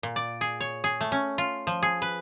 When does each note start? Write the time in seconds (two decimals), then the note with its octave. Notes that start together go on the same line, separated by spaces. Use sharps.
0.03 A#2
0.16 D5
0.41 G#4
0.61 C#5
0.84 G#4
1.01 A3
1.12 C#4
1.38 F4
1.67 F3
1.83 G#4
2.02 B4